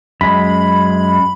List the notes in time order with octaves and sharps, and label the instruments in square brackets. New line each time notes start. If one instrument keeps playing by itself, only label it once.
[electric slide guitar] F#2 G#3 [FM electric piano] B5